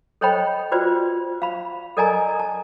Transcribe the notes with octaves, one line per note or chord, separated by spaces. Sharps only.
A4 C5 C#5 D#5 G5 B5
F4 F#4 B4 C5 D5
F5 B5
A4 A#4 D5 D#5 G#5 A#5
A5